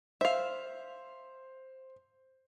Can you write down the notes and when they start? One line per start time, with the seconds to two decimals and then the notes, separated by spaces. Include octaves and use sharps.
0.21 C5 E5 F5